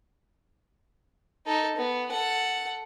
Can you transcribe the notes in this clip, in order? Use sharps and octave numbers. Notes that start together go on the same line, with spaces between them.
D#4 A4
B3
A4 F#5